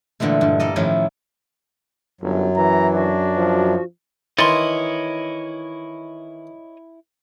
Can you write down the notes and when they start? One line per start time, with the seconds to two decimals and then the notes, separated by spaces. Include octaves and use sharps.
0.20 A#2 D3 E3 G#3 A3
0.41 G2
0.60 G3 A#3 A4 D#5
0.76 A2 D#3 F3 C#4 E4
2.21 G1 F#2 F#3
2.57 E3 A#5
2.95 D4 F#4
3.36 F3
4.38 D#3 E3 E4 C#5 D#5 C6 A6